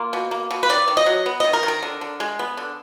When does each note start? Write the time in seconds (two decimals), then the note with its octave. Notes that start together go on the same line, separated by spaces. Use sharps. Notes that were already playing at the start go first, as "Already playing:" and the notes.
Already playing: A#3 F4
0.13 B2
0.31 A#3
0.51 B2
0.63 B4
0.69 D#3 D5
0.88 D#3
0.97 D#5
1.06 F#3
1.26 B3
1.40 D#3 D#5
1.53 A#4
1.63 D#3
1.68 A#4
1.82 D3
2.01 D3
2.20 G#3
2.39 B3
2.57 D3